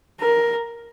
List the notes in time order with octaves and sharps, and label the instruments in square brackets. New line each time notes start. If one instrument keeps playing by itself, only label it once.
[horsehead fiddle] A#4